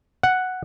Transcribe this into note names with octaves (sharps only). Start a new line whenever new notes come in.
F#5